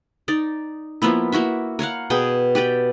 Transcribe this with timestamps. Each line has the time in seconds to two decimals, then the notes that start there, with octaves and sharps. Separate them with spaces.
0.28 D#4 D5
1.02 F3 A#3 B3 E4
1.32 A#3 E4 F#4 E5
1.79 A#4 C#5 F5 F#5
2.10 B2 B3 G#4 G5
2.55 G4 B4 D5 G5